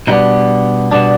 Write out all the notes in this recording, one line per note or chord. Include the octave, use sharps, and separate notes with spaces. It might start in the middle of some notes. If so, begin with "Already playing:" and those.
B2 G3 B3 D4 D#4
B2 G3 B3 D4